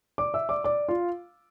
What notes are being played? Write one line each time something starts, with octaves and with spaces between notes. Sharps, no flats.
D5 D6
E5 E6
D5 D6
D5 D6
F4 F5